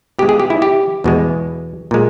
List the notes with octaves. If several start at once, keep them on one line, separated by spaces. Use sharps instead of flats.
B2 G#3 G4
G#4
G4
E4
G4
E2 B2 G#3
A#2 G#3